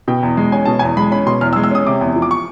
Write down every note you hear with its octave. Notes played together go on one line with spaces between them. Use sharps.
B2 G5
E2
G#3
C#4 G#5
B2 A5
G#5
E2
G#3 B5
C#4 B5
B2 C6
E2 F6
E6
G#3
E6
C#4 D#6
C3 D6
E2
F3
D6
C#6